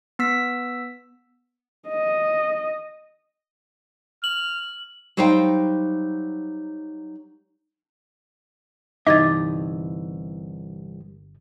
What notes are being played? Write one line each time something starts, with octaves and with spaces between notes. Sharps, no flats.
B3 E6 B6
D#5
F6 F#7
F#3 G3 D#4 C5 F5 G5
G1 C2 E3 D#4 D#5 D6 G#6 A6